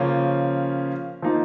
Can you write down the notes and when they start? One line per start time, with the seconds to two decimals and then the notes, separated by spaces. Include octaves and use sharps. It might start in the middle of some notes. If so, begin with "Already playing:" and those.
Already playing: C#3 F3 A#3 C#4
1.22 F3 A#3 D#4